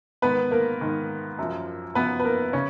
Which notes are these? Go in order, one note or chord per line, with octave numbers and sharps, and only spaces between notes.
G#2 D#3 B3 B4
A#3 A#4
G#2 D#3
F#2 F3
F#2 F3 B3 B4
B4
A#3 A#4
C#3 C#4